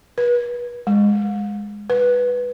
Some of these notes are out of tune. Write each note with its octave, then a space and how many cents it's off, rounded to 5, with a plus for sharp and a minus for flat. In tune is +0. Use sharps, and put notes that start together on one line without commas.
B4 -35
G#3 -10
B4 -5